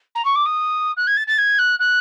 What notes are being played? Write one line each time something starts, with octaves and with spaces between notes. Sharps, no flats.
A#5
C#6
D6
D#6
F#6
G#6
A6
A6
G#6
F#6
F#6